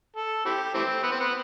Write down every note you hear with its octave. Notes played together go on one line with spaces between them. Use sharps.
A4
C4 E4 G4
E3 A3 C4
B3
C4
B3